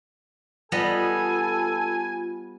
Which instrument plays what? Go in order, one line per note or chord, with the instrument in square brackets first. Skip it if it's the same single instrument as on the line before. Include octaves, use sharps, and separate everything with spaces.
[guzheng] G3 B3 D#5 [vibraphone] F4 [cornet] A4 [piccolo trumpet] G#5